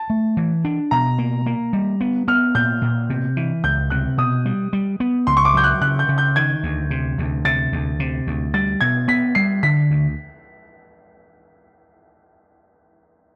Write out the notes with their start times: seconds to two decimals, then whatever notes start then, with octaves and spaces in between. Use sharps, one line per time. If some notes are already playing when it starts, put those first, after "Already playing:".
Already playing: A5
0.10 A3
0.37 E3
0.65 D4
0.91 B2 A#5
1.18 A#3
1.46 A#3
1.73 G3
2.00 B3
2.28 B3 F6
2.55 A#2 G6
2.82 A#2
3.10 C3
3.37 E3
3.64 C#2 G6
3.90 C3 F#6
4.18 B2 D#6
4.46 G3
4.73 G3
5.00 B3
5.27 C#2 C6
5.37 C#6
5.45 D6
5.54 F#3 G6
5.64 F#6
5.81 C#3 F#6
5.99 G6
6.09 C#3
6.18 G6
6.36 D#3 G#6
6.63 D2
6.91 C3
7.18 D2
7.45 C3 A6
7.72 D2
7.99 C3
8.27 D2
8.54 G3 A6
8.81 B2 G#6
9.08 B3 B6
9.35 G3 C7
9.63 D3 B6
9.90 D2